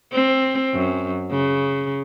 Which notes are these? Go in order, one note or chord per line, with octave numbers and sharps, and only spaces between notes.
C4
F#2
C#3